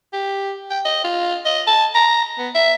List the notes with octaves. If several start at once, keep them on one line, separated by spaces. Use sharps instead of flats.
G4
G5
D#5
F4
D#5
A5
A#5
B3
E5